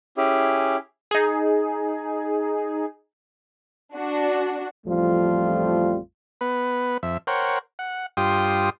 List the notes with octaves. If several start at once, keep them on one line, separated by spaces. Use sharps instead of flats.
C#4 E4 G4 G#4
D#4 G#4
D4 F#4
A1 F2 F3 G3 A3 F4
B3 B4
F2 E5
A#4 C5 C#5 F#5 G5
F#5
G2 F4 G4 G5 C6 D#6